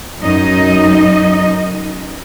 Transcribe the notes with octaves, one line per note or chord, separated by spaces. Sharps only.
F#2 D#4 D#5